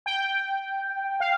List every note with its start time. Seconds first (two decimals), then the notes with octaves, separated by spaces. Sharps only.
0.06 G5
1.20 F5